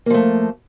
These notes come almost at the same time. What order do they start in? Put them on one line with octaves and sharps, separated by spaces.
A#3 F3 A3